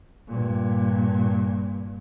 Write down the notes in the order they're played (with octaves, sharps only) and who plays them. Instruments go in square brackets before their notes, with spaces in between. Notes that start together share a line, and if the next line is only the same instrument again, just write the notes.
[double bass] G2 A#2